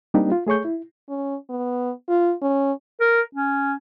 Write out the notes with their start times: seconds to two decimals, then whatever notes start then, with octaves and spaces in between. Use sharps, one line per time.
0.14 G3 A#3 C4 D4 D#4 G4
0.32 F4
0.47 A3 G#4 C#5 C#6 G6
0.65 E4
1.09 C#4
1.50 B3
2.09 F4
2.42 C#4
3.00 A#4
3.35 C#4